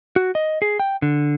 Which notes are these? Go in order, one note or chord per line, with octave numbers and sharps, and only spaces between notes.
F#4
D#5
G#4
G5
D3